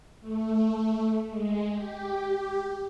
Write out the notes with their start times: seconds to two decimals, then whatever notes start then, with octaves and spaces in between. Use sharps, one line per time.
0.21 A3
1.29 G#3
1.74 G4